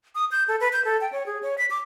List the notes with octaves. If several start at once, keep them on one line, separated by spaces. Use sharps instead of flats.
D#6
G6
A4
B4
G6
A4
G5
C#5
G#4
C#5
B6
D6